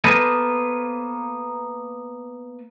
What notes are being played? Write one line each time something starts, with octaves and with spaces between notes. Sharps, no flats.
A#3 B3 A4 B4 C5 D#5